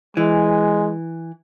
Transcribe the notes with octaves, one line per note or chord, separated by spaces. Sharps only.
E3 G#3